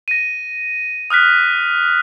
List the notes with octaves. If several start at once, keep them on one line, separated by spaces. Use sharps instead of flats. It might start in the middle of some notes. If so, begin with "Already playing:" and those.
A#6 D#7
D#6 F6 F#6 B6